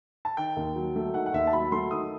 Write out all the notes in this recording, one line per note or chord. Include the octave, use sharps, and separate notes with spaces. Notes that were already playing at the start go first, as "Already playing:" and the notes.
A5
D#3 G5
D#2
F#3
A3
D#3 F#5
F#5
D#2 E5
A5
F#3 B5
A3 C6
D#3 D#6